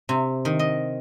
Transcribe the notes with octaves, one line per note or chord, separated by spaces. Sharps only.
C3
D#3
D#5